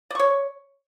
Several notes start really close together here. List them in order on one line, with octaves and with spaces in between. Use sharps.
D5 C#6 C#5